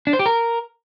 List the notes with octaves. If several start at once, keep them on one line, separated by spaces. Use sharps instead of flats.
D4
C5
G4
A#4